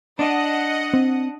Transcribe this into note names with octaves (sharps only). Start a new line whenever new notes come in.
D4 D#5 F#5 D#6
C4